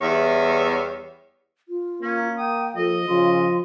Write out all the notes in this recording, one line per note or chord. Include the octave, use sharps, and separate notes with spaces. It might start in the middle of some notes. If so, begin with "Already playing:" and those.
E2 E3 G3 C#5 E5
F4
A#3 C#4
G5 D#6
F3 A4 D#5
C#3 F3 C6